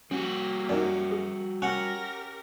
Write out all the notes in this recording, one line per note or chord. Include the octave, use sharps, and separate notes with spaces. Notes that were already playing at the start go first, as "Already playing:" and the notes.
G3 A#3 C#4 F#4 G4
F#2 D#4 A#4 D5
G4 G#4
C#4 G4 A#4 F#5 F#6